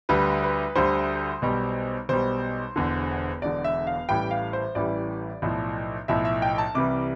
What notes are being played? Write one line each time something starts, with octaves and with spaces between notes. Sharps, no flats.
D2 D3 G3 B4
B4
D2 D3 G3 C5
B1 B2 G3
B1 B2 G3 C5
E1 E2 D3
E1 E2 D3 D5
E5
F5
A1 A2 E3 G3 G5
F5
C5
A1 A2 E3 G3 D5
B1 A2 F3
B1 A2 F3 E5
E5
G5
A5
C2 C3 E3 G3 D6